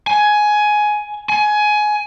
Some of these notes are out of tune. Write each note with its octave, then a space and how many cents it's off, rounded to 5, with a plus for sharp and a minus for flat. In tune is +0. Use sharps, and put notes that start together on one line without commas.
G#5 +15
G#5 +20